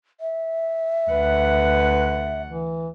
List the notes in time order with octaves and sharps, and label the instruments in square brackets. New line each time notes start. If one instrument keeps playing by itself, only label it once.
[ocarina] E5
[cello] D2 F#5 [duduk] B4
[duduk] E3